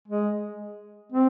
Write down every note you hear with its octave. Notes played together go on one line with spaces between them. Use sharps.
G#3
C4